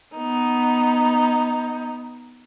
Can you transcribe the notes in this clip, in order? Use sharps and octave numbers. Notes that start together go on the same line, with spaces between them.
B3 D#4